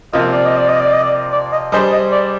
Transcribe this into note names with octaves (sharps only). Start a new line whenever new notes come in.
C3 F3 A#3 F4 D#5
D5
D#5
D5
D#5
D5
D#5
D5
D5
D#5
G3 D4 G#4 C5 D#5
D#5
D5